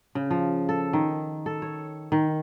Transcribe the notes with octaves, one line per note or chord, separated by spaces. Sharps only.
C#3
F3
A4
D#3
A4
C#5
D#3